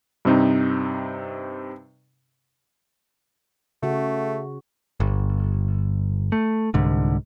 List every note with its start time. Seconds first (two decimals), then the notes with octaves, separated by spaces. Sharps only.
0.25 G2 C3 C4 D#4
3.83 C#3 A3 F#4
5.00 G1
6.32 A3
6.74 C2 G#2 D3